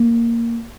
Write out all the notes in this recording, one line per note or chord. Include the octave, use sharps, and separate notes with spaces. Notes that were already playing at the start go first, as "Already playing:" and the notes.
Already playing: A#3